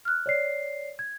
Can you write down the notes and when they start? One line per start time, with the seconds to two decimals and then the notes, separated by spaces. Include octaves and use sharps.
0.05 F6 F#6
0.26 C#5 D5 C7
0.99 G#6